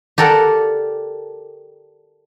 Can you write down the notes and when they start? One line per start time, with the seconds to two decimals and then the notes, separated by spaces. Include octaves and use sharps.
0.18 G4 A4 A#4 D5 F#5